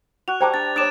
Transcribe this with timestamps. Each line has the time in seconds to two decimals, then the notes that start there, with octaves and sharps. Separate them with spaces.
0.28 F#4 F#6 F7
0.41 G3 C5 G5 A5 A#5 D6 G#6
0.54 D4 A6
0.76 D4 C#5 D6 D#6 A6 D7 E7